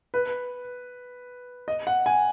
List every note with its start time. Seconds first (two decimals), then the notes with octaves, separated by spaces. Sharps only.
0.14 B4
1.68 D#5
1.87 F#5
2.06 G#5